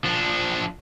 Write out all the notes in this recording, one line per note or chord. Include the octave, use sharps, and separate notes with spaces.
F3 D4